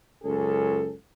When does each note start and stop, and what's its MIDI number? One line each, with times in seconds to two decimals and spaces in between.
0.23 0.92 37
0.23 0.92 42
0.23 0.92 61
0.23 0.92 68
0.23 0.92 69